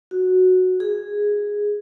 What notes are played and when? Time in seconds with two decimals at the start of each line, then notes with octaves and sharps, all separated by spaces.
0.11 F#4
0.80 G#4